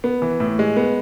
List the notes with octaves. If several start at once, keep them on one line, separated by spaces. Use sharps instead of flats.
B3
E3
A2
G#3
B3